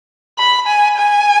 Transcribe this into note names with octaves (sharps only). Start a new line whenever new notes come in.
B5
G#5
G#5